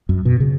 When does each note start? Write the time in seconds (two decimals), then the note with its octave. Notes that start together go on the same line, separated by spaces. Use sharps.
0.09 F#2
0.25 B2
0.40 C#3